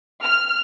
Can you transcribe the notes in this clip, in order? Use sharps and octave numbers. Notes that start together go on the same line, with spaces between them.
F6